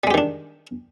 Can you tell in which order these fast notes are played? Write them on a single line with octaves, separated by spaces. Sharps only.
G3 G#3 G4 D#3 D4